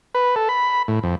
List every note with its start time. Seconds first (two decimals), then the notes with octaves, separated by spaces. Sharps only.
0.15 B4
0.36 A4
0.49 B5
0.88 A2
1.03 F2